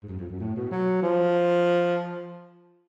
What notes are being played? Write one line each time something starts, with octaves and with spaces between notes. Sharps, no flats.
G#2
F#2
F2
F#2
A2
B2
F#3
F3